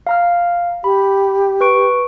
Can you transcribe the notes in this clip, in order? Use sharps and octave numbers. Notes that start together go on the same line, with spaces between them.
F5 A#5 F6
G4 B5
B4 C#6 D7